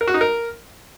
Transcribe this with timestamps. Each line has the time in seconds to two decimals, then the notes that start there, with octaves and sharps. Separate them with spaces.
0.01 A#4
0.08 F#4
0.14 D#4
0.21 A#4